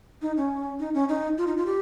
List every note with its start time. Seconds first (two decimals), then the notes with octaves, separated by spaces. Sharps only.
0.22 D#4
0.37 C#4
0.80 D#4
0.94 C#4
1.09 D#4
1.38 F4
1.47 D#4
1.57 F4
1.66 G4